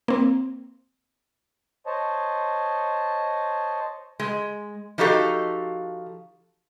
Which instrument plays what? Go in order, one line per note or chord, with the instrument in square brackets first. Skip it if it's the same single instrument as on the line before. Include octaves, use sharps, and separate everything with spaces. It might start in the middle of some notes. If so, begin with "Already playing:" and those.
[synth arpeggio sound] A#3 C4
[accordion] C5 C#5 D#5 A5
[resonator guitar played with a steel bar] G#3
F3 D#4 F#4 G4 A4 F5